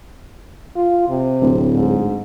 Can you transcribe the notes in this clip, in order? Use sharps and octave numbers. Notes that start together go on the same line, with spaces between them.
F4
C3
D1
G#2